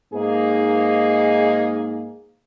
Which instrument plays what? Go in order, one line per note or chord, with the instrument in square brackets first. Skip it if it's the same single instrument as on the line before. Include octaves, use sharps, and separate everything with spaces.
[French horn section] G#2 A#3 D#4 G#4